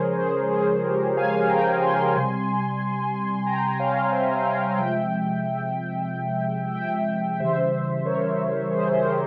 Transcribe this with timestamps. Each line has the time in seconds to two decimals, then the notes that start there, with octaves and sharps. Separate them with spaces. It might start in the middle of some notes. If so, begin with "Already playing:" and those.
Already playing: C#3 F3 G#3 G#4 A#4 C5 C#5
0.18 G#4 C5
0.51 G#4 C5
0.84 G4 A#4
1.17 F5 G#5
1.49 G5 A#5
1.82 G#5 C6
2.15 C3 G3
3.46 G5 A#5
3.79 C#5 F5
4.11 C5 E5
4.40 G5
4.45 C#5 F5
4.74 F5
4.77 C3 F3 G#3 E5 G5
6.74 E5 G5
7.39 C#3 E3 G3 C5 E5
8.05 A#4 C#5
8.71 G#4 C5
8.92 C5
9.04 G4 A#4